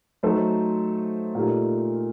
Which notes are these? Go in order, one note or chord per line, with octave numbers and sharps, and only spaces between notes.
F#3 A3 D#4 A4 C5
A#2 A3 D#4 G4 A#4